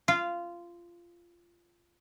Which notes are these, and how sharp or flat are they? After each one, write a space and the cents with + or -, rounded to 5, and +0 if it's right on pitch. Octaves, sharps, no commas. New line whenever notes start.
F4 -15